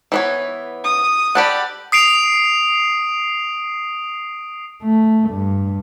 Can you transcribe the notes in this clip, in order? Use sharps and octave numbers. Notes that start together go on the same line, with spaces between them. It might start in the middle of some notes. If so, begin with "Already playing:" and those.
E3 B3 C#5
D#6
G4 A4 D5 F#5 B5
D#6 C7 D7 F7
A3
G2